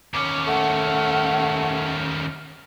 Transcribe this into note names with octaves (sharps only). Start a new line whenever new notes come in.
D#2 C#4 D6
A3 F#5